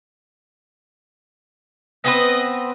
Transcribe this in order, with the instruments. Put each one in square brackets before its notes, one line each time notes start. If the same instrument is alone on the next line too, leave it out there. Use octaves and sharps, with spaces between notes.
[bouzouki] B3 C4 B4 [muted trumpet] D#5